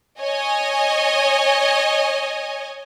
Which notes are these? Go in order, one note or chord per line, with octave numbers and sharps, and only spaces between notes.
C#5 D#5 G#5